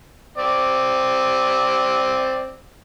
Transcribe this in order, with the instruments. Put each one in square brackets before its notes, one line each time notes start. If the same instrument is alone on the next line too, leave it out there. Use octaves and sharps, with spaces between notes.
[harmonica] C4 D5